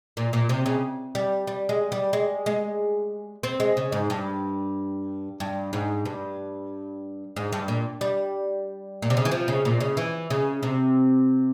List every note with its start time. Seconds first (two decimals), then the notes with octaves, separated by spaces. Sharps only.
0.17 A#2
0.33 A#2
0.49 C3
0.66 C#3
1.15 G3
1.47 G3
1.69 G#3
1.92 G3
2.13 G#3
2.46 G#3
3.43 C4
3.60 G#3
3.77 C#3
3.92 G#2
4.10 G2
5.40 G2
5.73 G#2
6.05 G2
7.36 G#2
7.52 G2
7.68 A#2
8.01 G3
9.02 A#2
9.10 C3
9.17 C#3
9.25 E3
9.31 F3
9.48 C#3
9.65 A#2
9.80 C#3
9.97 E3
10.30 C#3
10.63 C3